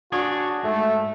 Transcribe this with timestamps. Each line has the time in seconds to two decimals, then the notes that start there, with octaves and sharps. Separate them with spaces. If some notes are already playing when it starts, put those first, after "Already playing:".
0.12 D4 F#4 G#4 C#5
0.64 G#2 A3